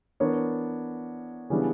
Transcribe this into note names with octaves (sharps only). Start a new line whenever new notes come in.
E3 B3 D4 A#4 C#5
C#3 E3 G3 B3 D4